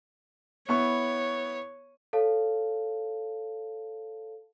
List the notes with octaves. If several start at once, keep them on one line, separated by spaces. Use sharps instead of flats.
B3 E4 C#5 C#6
A4 C#5 F5 A5